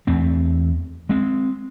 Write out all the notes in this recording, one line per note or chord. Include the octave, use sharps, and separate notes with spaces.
E2 A3 C4
G#3 C4